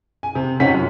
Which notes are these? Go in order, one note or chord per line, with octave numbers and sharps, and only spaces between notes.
G#5
C3
F2 C3 C#4 D#4 F#5 B6
F#2